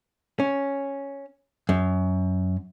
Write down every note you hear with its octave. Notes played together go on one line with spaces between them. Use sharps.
C#4
F#2